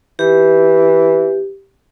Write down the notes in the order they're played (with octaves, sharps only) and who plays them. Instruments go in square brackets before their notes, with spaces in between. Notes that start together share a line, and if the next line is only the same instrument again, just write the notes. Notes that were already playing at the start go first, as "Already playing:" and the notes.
[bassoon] E3 [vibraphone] G4